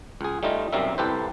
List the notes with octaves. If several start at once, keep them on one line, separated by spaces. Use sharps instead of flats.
C#2 G#4
G3 A3 D#4 F4 D#5
B1 F#2 C3 G3 A#4 E5
C2 G4 A4 B4 C5